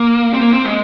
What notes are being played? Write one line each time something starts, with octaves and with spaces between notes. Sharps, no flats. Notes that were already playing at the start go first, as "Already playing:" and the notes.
Already playing: A#3
C4
A#3
C4
G#3